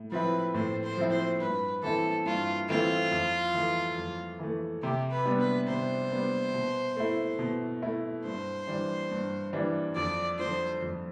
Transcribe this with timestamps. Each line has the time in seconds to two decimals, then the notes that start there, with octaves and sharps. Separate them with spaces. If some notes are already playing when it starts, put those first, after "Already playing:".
Already playing: A2
0.12 F3 C4 E4 B4
0.54 A2 C5
0.83 C5
0.97 F3 C4 E4
1.11 C5
1.40 G2 B4
1.83 E3 A3 C4 E4 A4
2.26 G2 F4
2.68 E3 A3 C4 E4 F4
3.12 F2
3.54 E3 A3
3.98 F2
4.39 E3 A3
4.82 C3 G4
5.11 B4
5.26 G3 B3 D4
5.40 B4
5.68 C3 C5
6.11 G3 B3 D4
6.54 B2
6.96 A3 E4
7.39 B2
7.82 A3 E4
8.25 G2 C5
8.67 E3 G3 D4
9.11 G2
9.53 E3 G3 D4
9.96 F2 D5
10.39 D3 F3 C5
10.82 F2